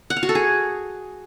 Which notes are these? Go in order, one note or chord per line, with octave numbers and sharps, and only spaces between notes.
F#5
F5
F#4
A4
G#4